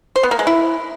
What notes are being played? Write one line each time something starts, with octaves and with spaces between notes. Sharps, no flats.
C5
B3
A#3
G#3
E4